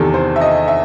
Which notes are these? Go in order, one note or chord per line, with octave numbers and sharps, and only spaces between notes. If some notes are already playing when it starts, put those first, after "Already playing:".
Already playing: E2 C3 D#3 A4
C5
E5
D#5
E5